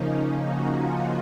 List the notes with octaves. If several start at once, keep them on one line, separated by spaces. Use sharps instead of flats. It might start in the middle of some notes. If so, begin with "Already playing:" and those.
Already playing: C#3 F3 A#3 C#4 D#4
F#4
F4